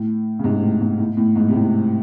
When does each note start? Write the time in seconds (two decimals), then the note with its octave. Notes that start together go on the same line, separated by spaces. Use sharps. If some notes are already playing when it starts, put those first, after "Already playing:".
Already playing: A2
0.39 C#3
0.43 G#2 C3
0.63 A2
0.81 G#2
0.99 A2
1.17 A2
1.36 G#2
1.49 C3
1.54 A2